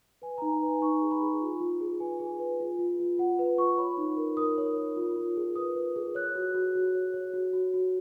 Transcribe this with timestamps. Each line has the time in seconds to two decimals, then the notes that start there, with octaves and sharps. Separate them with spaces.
0.22 B4 G#5
0.38 A#5
0.42 D#4
0.52 G#5
0.62 B4 G#5
0.82 D#4 C#6
1.02 G#4
1.11 B5
1.21 G#4
1.41 F4
1.61 F4
1.81 G#4
2.00 B4 G#5
2.20 G#4
2.39 B4
2.60 F4
2.79 F4
3.00 F4
3.18 F4 F#5
3.39 B4
3.58 F4 C#6
3.78 C#5 B5
3.97 D#4
4.17 A#4
4.37 A#4 D#6
4.58 C#5
4.77 A#4
4.97 F4
5.16 F4
5.37 G#4
5.56 B4 D#6
5.75 B4
5.96 G#4
6.15 C#5 F#6
6.35 F#4
6.54 F#4
6.75 F#4
6.95 C#5
7.14 C#5
7.33 F#4
7.53 F#4
7.74 F#4